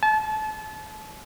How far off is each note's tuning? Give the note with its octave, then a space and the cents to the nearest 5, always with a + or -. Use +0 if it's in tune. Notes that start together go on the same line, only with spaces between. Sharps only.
A5 -30